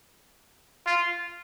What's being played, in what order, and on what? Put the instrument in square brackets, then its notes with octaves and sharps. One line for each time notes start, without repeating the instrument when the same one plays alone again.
[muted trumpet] F4